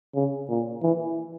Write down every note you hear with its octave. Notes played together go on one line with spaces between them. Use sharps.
C#3
A#2
E3